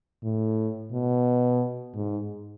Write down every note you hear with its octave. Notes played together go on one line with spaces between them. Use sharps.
A2
B2
G#2